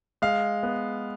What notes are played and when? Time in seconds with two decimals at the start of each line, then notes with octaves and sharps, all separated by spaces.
0.22 G#3 F5
0.63 B3